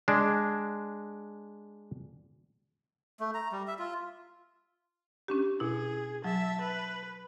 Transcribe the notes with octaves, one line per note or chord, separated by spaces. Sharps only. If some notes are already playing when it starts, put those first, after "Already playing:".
G#3 D4
A3
A#5
G3
E5
F4
C#4 D4 G4
B2 E4 G#4
F#3 E5 A5
B4